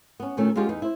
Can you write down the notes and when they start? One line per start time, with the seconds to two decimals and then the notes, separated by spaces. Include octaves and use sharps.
0.20 B3 C#4
0.37 A#2 D#3 A3 C#4
0.56 G#3 B3 C#4 F4 G4 G#4
0.69 E2 D#4 B4
0.82 E4 C5